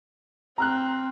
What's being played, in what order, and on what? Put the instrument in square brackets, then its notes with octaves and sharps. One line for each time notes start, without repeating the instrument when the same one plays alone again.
[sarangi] C4 [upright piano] A#5 F6 F#6